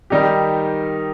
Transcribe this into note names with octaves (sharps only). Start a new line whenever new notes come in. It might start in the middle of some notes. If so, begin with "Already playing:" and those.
D#3 G3 D#4 G4